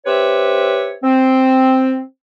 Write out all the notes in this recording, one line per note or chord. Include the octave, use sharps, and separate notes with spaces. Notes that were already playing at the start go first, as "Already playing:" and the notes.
C4 G4 B4 C#5 E5
C4